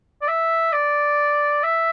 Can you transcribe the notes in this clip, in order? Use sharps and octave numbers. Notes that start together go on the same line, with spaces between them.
D5
E5
D5
E5